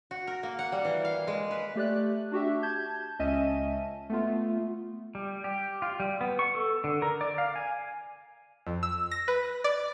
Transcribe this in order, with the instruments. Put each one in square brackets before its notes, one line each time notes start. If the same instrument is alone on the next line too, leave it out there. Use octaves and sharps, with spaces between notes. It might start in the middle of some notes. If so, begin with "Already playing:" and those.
[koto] F#4
A#4
A#3
F#5
G3
E3
F5
G#3
B4
[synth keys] A3 G4 D5 F#6
D4 F#4 G4 E5
A5 G6 G#6
C#2 C#4 D#5 E5 A5 D#7
A3 B3 F4
[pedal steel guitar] G3
G4
F4
G3
B3
C#6
A4
D3
A#4
D5
F5
G#5
[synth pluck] F2
E6
A#6
B4
D5